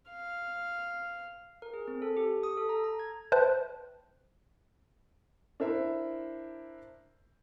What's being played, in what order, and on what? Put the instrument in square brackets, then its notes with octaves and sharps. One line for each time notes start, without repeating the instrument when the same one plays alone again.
[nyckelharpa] F5
[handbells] A#4
G#4
C4
A4
G4
D#6
A4
A#5
A#5
G#6
[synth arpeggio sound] B4 C5 E5 G5 A5 F#6
[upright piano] D4 E4 A#4 C5 E5